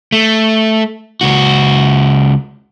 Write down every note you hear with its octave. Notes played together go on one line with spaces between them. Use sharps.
A3
C#2 F#4